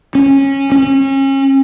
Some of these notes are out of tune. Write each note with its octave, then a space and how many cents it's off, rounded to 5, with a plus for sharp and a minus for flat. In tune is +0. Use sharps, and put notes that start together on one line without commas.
C#4 -15
C#4 -30